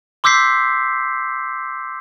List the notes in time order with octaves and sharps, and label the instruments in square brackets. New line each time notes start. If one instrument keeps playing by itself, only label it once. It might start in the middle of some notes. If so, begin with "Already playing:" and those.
[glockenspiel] C6 D6 E6 G6 B6 C7